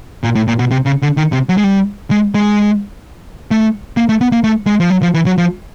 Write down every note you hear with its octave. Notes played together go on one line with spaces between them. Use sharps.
A#2
A2
A#2
B2
C3
C#3
D3
D#3
C3
F#3
G#3
G3
G#3
G#3
A3
A#3
A3
B3
A#3
A3
G#3
F3
F#3
F3
E3
F#3
F3